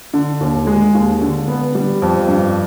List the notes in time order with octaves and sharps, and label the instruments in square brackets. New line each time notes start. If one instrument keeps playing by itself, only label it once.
[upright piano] D3
D#2
G#3
D#2
D3
B3
G3
F2
G2